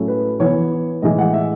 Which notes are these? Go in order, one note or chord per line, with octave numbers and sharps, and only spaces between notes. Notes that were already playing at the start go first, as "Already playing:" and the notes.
Already playing: A2 F#3 A3 C#4
B4
E3 B3 C#5
A2 E3 G#3 D#5
F#5
E5